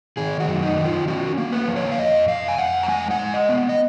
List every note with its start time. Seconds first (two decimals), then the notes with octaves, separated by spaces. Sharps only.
0.17 D#3 G#4
0.40 F#4
0.48 F#2
0.63 D#4
0.77 D#3
0.85 F4
1.08 C#4 F#4
1.38 A#3
1.52 B4
1.68 F3
1.76 C#5
1.92 F5
1.98 F2 D#5
2.28 F2 F5
2.48 G#5
2.58 F2 F#5
2.83 A#5
2.88 G#3 G#5
3.11 F#5
3.19 G#3
3.34 D#5
3.49 B3
3.69 D#5